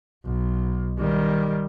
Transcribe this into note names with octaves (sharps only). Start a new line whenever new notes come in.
B1
D#3 G3